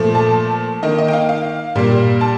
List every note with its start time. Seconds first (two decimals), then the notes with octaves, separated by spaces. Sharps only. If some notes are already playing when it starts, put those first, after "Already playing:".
Already playing: A#2 F3 A3
0.15 A5
0.83 D#3 A#3 D#5
0.99 D#5
1.08 G5
1.13 F5
1.29 F5
1.75 A#2 G3 A#3
2.21 A5